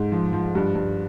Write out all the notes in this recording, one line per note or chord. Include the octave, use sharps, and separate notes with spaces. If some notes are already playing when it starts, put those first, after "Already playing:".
Already playing: G#2
F3
F3
G2
G2